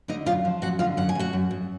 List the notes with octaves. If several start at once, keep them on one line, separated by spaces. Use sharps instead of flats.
D3 D#4 D#5
F#2 F4 F5
F3
F#2 F#4 F#5
D3 F4 F5
F#2 F#5
G#5
F#2 F#4 F#5
F#2
F#2